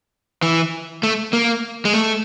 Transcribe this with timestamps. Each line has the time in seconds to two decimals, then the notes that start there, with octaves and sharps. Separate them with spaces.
0.43 E3
1.03 A3
1.33 A#3
1.85 G#3
1.94 A3